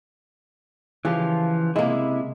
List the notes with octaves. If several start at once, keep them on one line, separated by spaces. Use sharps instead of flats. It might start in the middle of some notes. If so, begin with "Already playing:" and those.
C#3 E3 F3 F4 G4
C3 G#3 A#3 E4